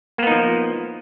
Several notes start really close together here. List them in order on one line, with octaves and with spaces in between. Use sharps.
A#3 B3 D#4 F3